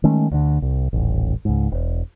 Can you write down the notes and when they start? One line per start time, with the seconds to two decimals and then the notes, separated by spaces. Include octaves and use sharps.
0.04 D#3 G#3 A3 C#4
0.31 D2 D3
0.62 C2
0.93 D#1 A1
1.45 C#2 G#2
1.71 E1